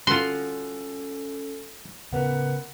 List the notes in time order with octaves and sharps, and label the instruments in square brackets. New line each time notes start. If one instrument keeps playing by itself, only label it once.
[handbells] C#4 A4 [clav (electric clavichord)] F4 F#4 [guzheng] C6
[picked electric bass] C#3 B3 [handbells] A#4 B4 F#5